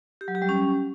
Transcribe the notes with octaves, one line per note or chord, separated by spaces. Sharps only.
G4
F#3
G4
G3
C#4